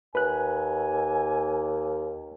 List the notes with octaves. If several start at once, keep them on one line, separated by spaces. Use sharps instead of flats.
D#2 B4 G#5 F#6